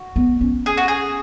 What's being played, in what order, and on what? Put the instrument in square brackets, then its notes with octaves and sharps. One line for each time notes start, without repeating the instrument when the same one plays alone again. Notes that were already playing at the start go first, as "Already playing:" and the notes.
Already playing: [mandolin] F#4
[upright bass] B3
C#4
[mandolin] G#4
F#4
G#4